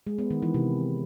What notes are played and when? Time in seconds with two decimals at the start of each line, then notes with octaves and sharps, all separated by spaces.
0.07 G#3
0.19 B3
0.30 D#3
0.42 E3
0.54 C3